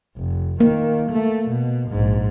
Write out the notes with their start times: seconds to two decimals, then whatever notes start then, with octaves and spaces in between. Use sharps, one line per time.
0.17 F1
0.60 D#3 A#3
1.11 A3
1.49 B2
1.89 A#1 G#2